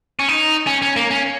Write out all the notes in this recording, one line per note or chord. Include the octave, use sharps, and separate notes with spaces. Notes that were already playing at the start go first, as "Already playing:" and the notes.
C#4
D#4
C#4
C#4
A#3
C#4